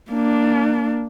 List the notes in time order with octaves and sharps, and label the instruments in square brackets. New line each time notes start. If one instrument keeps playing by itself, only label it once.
[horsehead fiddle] A#3 D4